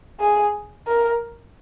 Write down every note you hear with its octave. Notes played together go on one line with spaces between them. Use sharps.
G#4
A#4